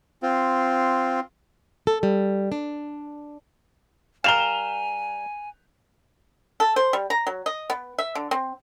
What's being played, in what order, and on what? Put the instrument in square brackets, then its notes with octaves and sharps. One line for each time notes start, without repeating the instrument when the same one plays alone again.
[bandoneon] C4 F4
[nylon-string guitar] A4
G3
D4
[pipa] G3 A#4 [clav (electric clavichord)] F5 [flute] G#5 [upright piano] E7 F7 G7
[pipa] A4
C5
G3
A#5
F#3
D#5
B3
E5
D3
C4